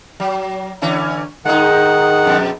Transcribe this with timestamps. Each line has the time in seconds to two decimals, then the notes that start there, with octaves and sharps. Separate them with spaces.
0.20 F#3
0.82 D3 E3 C#4
1.45 D#3 G#3 D#4 F#5
2.25 F2 B2